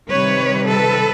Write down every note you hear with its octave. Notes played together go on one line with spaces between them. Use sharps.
C3 D#3 G3 B4 C#5
A4 B4